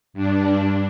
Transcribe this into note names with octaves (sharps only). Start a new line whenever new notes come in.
G2 D4